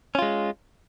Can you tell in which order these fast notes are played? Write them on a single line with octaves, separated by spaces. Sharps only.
C#4 F4 G#3